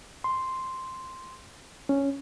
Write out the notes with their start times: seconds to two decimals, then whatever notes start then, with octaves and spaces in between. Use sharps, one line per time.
0.24 C6
1.89 C#4